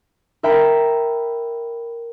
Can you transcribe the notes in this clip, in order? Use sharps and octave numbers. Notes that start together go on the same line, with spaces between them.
A#4 E5 G5 A#5 B5